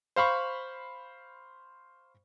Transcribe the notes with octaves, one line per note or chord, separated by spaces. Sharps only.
C5 F5 B5 C#6